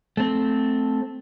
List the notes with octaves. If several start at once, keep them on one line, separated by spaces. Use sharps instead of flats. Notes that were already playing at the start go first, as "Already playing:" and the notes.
A3 C4